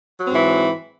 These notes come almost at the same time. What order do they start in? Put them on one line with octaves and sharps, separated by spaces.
F#3 C4 G#2 E3